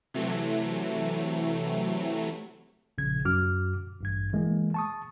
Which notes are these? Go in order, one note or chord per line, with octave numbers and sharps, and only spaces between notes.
C3 E3 F#3 A3
A#1 C#3 G#6
F#2 F#4 D6 F6
A1 G2 G#6
E3 G#3 A#3
A5 C#6 D#6